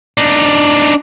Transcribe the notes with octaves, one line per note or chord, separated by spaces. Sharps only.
D4 D#4